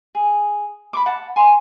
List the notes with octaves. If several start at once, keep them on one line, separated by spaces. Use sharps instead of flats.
G#4
B5 C#6 D6
F#5 A5
G#5 C6